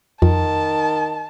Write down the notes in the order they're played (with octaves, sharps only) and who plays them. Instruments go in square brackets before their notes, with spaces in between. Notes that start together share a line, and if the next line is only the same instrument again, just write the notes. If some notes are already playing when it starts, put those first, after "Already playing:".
[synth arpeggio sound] F2 [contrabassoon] D#3 [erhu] A5